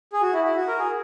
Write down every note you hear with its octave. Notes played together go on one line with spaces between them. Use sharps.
G#4
F#4
E4
E4
F#4
A#4
G#4